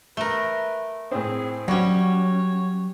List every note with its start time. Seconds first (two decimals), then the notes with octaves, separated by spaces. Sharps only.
0.17 A3 A#4 B4 G7
1.11 A2 C4 G#4
1.68 F#3 G3 C#4 F#4 C#5